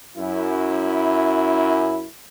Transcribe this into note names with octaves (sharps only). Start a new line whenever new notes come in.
F#2 E4